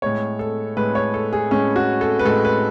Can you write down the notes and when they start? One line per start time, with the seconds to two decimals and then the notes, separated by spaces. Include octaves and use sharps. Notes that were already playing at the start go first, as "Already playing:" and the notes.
0.02 A2 G#3 C#5
0.39 A4
0.77 A2 G#3 B4
0.95 C#5
1.14 A4
1.33 G#4
1.51 A2 G#3 C#4
1.76 F#4
2.01 A4
2.19 B4
2.25 A2 G#3 A4
2.45 B4